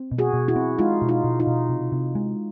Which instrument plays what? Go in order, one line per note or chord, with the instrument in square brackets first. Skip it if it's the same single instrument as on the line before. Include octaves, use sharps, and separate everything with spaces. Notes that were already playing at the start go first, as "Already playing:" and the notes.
Already playing: [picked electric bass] C4
B2
[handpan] F#4 G#4
[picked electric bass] B2
[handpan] E4 F#4
[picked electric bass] C4
[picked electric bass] G#3 [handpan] D#4 F4
[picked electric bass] B2
[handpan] D#4 F4
[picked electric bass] B2
[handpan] D#4 F4
[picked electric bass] B2
C3
C3
G#3